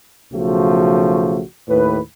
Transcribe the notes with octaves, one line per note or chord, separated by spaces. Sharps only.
B1 C#3 F3 A3 F#4
D#2 A2 B4